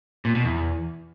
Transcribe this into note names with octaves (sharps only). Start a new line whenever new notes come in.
A#2
B2
E2